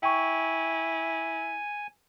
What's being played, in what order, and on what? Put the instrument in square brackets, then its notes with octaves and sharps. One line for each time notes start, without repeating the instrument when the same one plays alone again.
[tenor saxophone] E4 [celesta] G5 C#6 [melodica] G#5